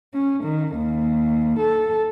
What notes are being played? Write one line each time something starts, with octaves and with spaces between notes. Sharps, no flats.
C#4
D#3
D#2
A4